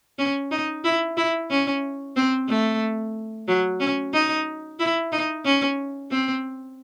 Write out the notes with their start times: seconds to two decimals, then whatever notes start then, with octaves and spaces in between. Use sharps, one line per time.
0.19 C#4
0.51 D#4
0.84 E4
1.17 E4
1.51 C#4
2.16 C4
2.49 A3
3.48 F#3
3.80 C#4
4.13 D#4
4.79 E4
5.12 D#4
5.45 C#4
6.11 C4